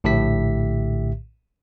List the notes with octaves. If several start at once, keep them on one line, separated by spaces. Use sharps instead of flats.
A#1 A2 D3 G4 E5 B6